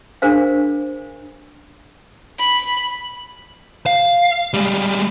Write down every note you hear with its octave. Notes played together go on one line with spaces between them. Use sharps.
D4 G#4 A#4 C5 F5
B5
F5
G3 G#3